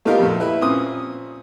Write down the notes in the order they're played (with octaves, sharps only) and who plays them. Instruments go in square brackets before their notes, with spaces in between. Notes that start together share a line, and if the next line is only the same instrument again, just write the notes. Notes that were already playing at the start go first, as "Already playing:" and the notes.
[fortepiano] A3 B3 D#4 F4 G4 A#4
F2 A#2 A3
E4 B4
A#2 C4 C#4 D#6